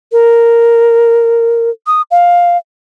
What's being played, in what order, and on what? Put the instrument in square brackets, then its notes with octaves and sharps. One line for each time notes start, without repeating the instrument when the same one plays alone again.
[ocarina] A#4
D#6
F5